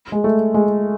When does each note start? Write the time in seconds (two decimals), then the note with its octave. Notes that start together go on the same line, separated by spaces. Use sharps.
0.12 G#3
0.24 A3
0.54 G#3